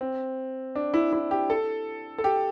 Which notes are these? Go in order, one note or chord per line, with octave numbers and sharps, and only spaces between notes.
C4
D4
E4
E4
G4
A4
A4
G4